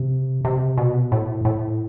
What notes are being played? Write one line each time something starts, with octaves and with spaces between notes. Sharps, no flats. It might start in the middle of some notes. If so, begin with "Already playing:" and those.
Already playing: C3
C3
B2
A2
A2